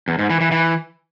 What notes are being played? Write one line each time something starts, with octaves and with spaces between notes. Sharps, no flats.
E2
G#2
E3
E3
E3